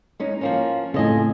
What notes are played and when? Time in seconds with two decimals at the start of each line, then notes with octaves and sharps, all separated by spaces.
0.20 G#3 C#4 D#4
0.41 F3 A#3 C#4
0.94 F2 A2 C#3 D#5 G#5